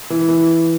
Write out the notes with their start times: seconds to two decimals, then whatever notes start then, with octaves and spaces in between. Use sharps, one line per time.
0.10 E3
0.29 E3